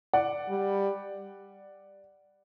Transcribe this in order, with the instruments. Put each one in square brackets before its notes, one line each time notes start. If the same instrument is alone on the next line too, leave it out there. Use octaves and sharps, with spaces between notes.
[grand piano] D5 F#5
[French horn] G3